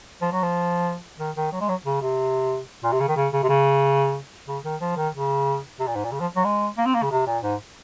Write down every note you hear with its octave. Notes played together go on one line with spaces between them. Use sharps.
F3
F#3
F3
D#3
D#3
F#3
G#3
F#3
C#3
C3
A#2
C3
C#3
D#3
C#3
C#3
C3
C#3
C#3
D#3
F3
D#3
C#3
C3
A#2
G#2
A#2
C#3
F3
F#3
G#3
A#3
C4
A#3
C#3
C3
A#2
G#2